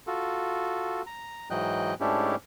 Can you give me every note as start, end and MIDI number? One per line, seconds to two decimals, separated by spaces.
0.07 1.02 65
0.07 1.02 66
0.07 1.02 69
1.07 1.49 82
1.50 1.94 44
1.50 1.94 52
1.50 1.94 54
1.50 1.94 75
1.50 1.94 79
1.50 1.94 90
2.01 2.35 44
2.01 2.35 57
2.01 2.35 61
2.01 2.35 62
2.01 2.35 64
2.01 2.35 67